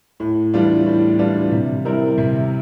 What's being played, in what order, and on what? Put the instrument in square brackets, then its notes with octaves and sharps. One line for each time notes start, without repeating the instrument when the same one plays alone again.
[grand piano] A2
E3 G3 D4 F4
A2
E3 G3 D4 F4
C3
G3 C4 E4 A#4
C3